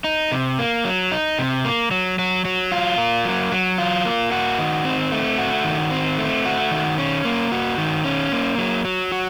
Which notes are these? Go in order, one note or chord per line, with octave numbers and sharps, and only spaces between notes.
D#4
C3
A#3
F#3
D#4
C3
A#3
F#3
F#3
F#3
F4
A#3
F#3
F#3
F4
A#3
F#4
D#3
C4
A3
F#4
D#3
C4
A3
F#4
D#3
C#4
A#3
F#4
D#3
C#4
A#3
F#3
F#3
F#4